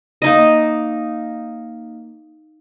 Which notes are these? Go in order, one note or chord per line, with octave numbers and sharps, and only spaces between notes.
A#3 D#4 D#5